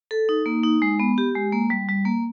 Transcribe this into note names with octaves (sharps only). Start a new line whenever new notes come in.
A4
D#4
A#3
D#4
G#3
B3
G4
G#3
A#3
G3
G3
A#3